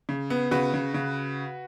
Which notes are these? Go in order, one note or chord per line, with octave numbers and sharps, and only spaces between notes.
C#3
B3
C#3 F#4 B4
C#3
C#3